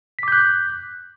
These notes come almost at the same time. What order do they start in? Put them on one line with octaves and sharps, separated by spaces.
B6 D6 G6 F#6